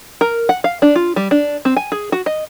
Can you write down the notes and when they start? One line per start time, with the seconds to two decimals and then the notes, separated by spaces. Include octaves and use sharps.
0.21 A#4
0.49 F#5
0.64 F5
0.82 D4
0.96 F4
1.16 G3
1.31 D4
1.65 C4
1.77 G#5
1.92 G#4
2.12 F#4
2.26 D#5